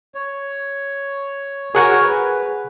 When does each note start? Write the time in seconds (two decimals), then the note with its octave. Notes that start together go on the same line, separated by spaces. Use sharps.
0.15 C#5
1.75 F#4 G#4 A#4 C#5 F#5 G#5
2.01 B4